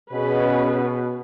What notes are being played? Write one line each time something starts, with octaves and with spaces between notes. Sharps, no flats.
B2 C#4 G#4 B4